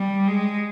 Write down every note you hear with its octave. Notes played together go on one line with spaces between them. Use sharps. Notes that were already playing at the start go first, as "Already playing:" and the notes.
Already playing: G3
G#3